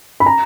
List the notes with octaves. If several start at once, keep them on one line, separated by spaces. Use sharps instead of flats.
B5
A#5